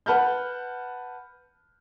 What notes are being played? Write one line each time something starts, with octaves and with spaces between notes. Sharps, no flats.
B4 F#5 A5 B5 F6 G6